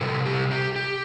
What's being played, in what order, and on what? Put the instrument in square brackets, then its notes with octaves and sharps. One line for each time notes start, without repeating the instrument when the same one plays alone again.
[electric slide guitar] C3 G3 A4
G4
G4
G4